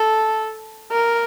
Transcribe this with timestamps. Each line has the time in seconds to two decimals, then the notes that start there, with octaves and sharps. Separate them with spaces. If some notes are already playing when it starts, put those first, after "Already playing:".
Already playing: A4
0.91 A#4